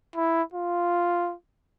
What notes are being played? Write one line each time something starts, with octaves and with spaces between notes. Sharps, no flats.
E4
F4